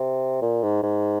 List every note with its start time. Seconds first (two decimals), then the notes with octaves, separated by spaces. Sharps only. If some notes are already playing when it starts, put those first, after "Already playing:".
Already playing: C3
0.42 A#2
0.63 G#2
0.83 G#2